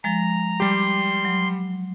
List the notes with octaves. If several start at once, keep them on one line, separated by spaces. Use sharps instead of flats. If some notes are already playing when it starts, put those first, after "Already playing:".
F3 G#3 A#5
G3 G4 C6
F#3